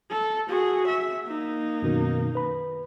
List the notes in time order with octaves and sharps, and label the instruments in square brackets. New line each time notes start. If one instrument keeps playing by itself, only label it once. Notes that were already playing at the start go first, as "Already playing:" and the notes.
[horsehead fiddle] A4
F#4 G#4
E5
A#3 D#4
[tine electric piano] F#2 B2 D#3
B4 B5